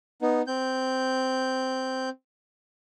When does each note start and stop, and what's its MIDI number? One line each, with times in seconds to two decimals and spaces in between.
0.22 0.42 59
0.22 0.42 63
0.47 2.09 60
0.47 2.09 91